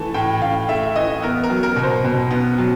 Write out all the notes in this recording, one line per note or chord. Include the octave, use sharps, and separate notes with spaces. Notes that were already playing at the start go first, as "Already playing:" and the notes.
Already playing: E3 A3 A5
A2 G5
A2 F5
A3 E5
E3 D#5
B3 A#4
A#4
F#3
A#4
B2
C5
B2
B3
F#3